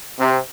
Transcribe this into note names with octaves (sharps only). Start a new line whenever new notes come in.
C3